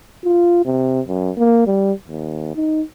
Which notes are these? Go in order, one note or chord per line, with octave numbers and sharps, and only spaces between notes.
F4
C3
F#2
A#3
G3
D#2
D#4